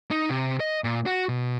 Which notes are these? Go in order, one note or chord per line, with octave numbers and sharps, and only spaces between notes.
D#4
C3
D#5
A#2
F#4
B2